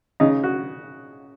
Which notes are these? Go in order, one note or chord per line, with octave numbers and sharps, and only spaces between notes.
C#3 D#4
F#4